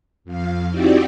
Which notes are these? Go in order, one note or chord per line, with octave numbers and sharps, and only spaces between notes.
F2 F5
C4 D#4 E4 F#4 G4 D5